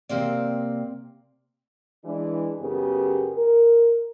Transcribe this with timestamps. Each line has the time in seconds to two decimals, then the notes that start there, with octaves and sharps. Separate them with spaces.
0.09 C3 A#3 C4 D5
2.04 E3 G#3 D4
2.60 F#2 C#3 B3 G4 G#4 A#4
3.35 A#4